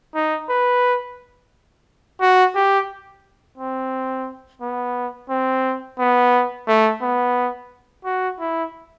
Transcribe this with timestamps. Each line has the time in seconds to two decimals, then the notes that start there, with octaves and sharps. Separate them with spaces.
0.15 D#4
0.49 B4
2.21 F#4
2.55 G4
3.58 C4
4.61 B3
5.30 C4
5.99 B3
6.68 A3
7.02 B3
8.05 F#4
8.40 E4